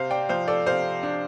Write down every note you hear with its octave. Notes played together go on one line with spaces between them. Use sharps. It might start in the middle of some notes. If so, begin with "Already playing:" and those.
Already playing: C3 C5 F5
D5 G5
F3 C5 F5
A4 D5
C3 C5 F5
D4